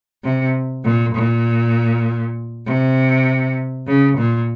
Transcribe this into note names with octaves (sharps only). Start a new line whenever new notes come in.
C3
A#2
A#2
C3
C#3
A#2